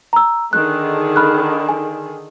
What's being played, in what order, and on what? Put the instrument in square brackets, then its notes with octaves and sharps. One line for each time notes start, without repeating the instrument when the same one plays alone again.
[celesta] A#5 E6
[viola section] D3 D#3 G#4 [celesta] F#6
[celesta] B5 F6 F#6
G#5